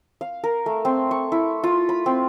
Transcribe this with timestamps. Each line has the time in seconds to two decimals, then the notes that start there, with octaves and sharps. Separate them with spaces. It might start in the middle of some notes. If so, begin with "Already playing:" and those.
0.21 F5
0.44 A#4
0.66 A3
0.85 C4
1.11 C#6
1.32 E4
1.64 F4
1.89 B5
2.06 C4